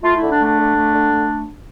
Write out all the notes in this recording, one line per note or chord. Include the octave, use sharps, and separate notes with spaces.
A3 F4
D3 E4
D4
A3 D4
D3
A3
D3
A3